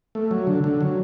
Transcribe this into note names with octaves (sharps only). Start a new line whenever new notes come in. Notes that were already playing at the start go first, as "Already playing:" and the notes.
A3
F#3
D3
D3
F#3